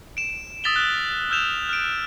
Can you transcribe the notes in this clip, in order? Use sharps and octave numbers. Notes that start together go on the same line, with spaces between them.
D7 E7
D#6 E6 A6 B6 F7 G7
F6 F#6
E6 F6 G6 E7 F7 G7
F6 D7